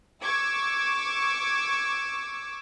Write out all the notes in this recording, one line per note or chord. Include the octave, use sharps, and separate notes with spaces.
C#6 D6 E6 G#6